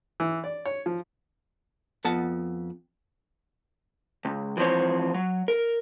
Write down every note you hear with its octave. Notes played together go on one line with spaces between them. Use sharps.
E3
D5
C#5
F3
F2 B3 F#5 A5
C#2
E3 F3 C4 C5 C#5
F#3
A#4